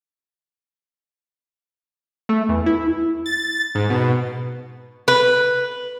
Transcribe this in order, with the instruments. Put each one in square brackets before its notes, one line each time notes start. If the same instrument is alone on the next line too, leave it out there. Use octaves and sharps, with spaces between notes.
[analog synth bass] A3
E2
E4
[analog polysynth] A6
G#2
B2
[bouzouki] B4